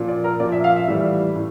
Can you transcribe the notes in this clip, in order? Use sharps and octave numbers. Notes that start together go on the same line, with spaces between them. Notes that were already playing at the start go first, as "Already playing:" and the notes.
Already playing: A#2 F3
D5
A#4
A#2 F3 D5
E5
F5
E5
A2 E3 G3 E5
A2